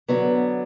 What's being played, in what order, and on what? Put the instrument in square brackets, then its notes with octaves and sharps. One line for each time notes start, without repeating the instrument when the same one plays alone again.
[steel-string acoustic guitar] D3 F#3 B3